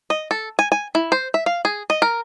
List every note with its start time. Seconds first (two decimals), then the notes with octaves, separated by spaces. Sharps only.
0.10 D#5
0.31 A4
0.59 G#5
0.72 G#5
0.95 E4
1.12 C5
1.34 E5
1.46 F5
1.65 G#4
1.90 D#5
2.02 A#4